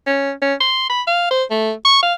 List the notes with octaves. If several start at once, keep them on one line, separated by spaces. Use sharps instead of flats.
C#4
C#4
C6
B5
F5
C5
A3
C#6
F5